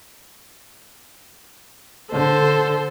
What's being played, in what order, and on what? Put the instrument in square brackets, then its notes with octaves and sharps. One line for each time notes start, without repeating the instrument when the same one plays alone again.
[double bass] D3 [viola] A4 C5